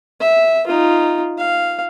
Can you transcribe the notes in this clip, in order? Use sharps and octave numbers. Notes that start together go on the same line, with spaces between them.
E5
D#4 F4
F5